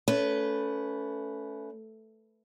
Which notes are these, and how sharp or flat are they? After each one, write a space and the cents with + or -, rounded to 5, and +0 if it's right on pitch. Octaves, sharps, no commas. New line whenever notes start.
A3 +5 C#4 +25 B4 +0